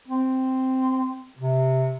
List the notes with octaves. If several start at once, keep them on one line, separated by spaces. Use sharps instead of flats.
C4
C3